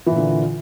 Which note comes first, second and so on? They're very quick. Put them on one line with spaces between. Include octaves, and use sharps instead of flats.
E3 A#2 D3